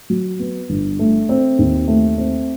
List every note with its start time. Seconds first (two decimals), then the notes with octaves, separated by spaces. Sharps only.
0.10 F#3
0.40 B3
0.70 G1
0.99 A3
1.29 C4
1.59 D#2
1.88 A3
2.18 C4